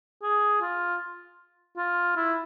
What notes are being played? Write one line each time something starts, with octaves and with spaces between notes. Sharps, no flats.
G#4
F4
F4
E4